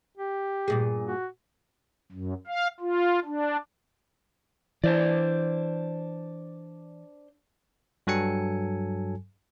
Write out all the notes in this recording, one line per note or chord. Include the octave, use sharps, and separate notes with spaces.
G4
G2 A#2 G#4
F#4
F#2
F5
F4
D4
E3 D4 C5 D5
G2 F#3 A4 G#5 C#7